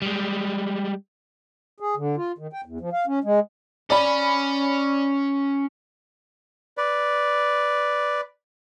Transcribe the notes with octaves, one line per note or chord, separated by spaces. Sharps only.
G3 G#3
G#4
D3
F4
D#3
G5
E2
F3
F5
C#4
G#3
C#4 D5 B5
B4 D5